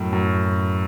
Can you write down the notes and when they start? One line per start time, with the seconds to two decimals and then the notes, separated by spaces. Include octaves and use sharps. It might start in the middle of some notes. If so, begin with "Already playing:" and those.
Already playing: F#2 A2
0.12 F#2